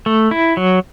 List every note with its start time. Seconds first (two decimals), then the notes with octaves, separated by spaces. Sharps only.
0.06 A3
0.31 E4
0.57 F#3